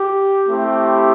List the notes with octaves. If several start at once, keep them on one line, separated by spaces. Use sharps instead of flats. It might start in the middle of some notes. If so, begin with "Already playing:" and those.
Already playing: G4
A3 C4 E4 G4